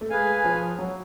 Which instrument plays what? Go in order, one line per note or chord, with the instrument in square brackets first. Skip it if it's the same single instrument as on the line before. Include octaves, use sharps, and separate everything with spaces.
[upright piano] A3
[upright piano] G#3 [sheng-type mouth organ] G#4 B4 F5 G#5
[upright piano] F3
F#3